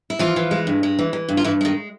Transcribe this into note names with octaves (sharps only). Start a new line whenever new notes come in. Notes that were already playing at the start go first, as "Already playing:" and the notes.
E4
E3 F3 F4
E3
G#3
G2
G#3
E3
E3
G2
F4
G2 E3 E4
D#3 G#3 D#4